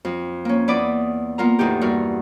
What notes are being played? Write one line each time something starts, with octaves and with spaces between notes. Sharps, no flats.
F2
A#3 C#4
E2 D5 B5 D6 D#6
A#3 B3 F4 A#4 A#5
E2 A2 D#3 D#4 G4
G2 F#4 A#4